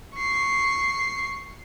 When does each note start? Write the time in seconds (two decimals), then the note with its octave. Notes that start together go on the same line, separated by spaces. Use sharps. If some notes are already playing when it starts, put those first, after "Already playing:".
0.15 C#6 C7